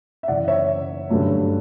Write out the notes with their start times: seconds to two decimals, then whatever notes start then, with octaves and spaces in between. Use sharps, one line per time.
0.23 E5
0.28 F#2 C#3 E3 D5 F#5
0.48 C#5 E5
1.09 G2 D3 F#3 A3 C#4